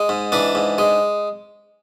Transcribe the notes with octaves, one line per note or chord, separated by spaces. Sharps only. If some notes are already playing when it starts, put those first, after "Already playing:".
Already playing: G#3
G#2
E3 D4
G#2
G#3